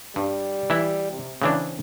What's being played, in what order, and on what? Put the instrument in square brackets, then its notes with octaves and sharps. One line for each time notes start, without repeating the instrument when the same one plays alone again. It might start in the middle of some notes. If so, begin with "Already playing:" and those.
[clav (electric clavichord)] G2 [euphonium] G3
[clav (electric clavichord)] E3 E4
[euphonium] C3
[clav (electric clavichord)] C#3 E3 D4 [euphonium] C4